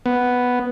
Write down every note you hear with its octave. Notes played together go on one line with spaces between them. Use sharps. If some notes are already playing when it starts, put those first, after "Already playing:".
B3